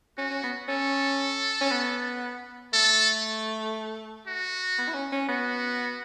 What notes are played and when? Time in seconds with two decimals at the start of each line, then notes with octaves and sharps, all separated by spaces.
0.17 C#4 F#4
0.30 C#4
0.43 B3
0.68 C#4 A4
1.61 C#4
1.71 B3
2.73 A3 A4
4.27 F#4
4.78 B3
4.88 E4
4.94 C#4
5.12 C#4
5.29 B3 F#4